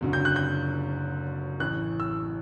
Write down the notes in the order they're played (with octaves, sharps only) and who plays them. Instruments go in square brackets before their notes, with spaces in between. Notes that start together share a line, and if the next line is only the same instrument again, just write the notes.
[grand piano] F#1 F#2 D3
G6
F#6
G6
A1 A2 E3 F#6
E6